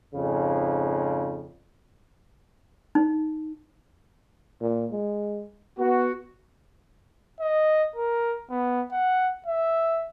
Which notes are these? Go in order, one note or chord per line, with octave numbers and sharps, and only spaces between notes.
F2 G#2 C#3
D#4
A#2
G#3
B3 F#4
D#5
A#4
B3
F#5
E5